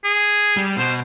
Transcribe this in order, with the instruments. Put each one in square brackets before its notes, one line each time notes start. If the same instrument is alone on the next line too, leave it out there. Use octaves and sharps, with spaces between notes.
[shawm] G#4
[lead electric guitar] G3
[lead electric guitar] B2 [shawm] C5